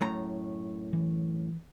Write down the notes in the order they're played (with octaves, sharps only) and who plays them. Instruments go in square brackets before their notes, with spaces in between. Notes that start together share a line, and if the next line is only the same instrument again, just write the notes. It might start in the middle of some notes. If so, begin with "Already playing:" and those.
[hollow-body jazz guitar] F#2 A2 A#5
[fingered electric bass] E3